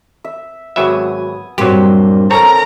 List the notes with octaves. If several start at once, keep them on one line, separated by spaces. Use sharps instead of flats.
E5
G#1 F#3 B3 E5 G#5 D#6
G2 A#2 F#3 C4 G4 C5
C4 A4 A#4 C#5 A#5